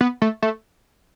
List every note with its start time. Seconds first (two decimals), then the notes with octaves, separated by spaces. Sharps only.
0.01 B3
0.22 A3
0.42 A3